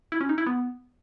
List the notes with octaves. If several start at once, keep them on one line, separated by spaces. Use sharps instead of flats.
E4
C#4
D#4
E4
B3